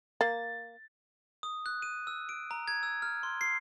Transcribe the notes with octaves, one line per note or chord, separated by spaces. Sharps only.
A#3 A6
D#6
F#6
D#7
E6
D7
A#5
G#6
E6
F6
C6
C7